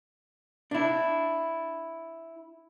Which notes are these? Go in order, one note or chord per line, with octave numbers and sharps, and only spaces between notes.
D4 E4